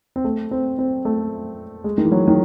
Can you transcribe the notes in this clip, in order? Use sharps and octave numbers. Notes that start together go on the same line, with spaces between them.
C4
A3
C4
C4
A3
G#3
D#3
E3
F#3
D#3